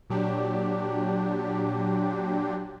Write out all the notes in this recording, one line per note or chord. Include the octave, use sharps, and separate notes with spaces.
A#2 F#3 D4 G4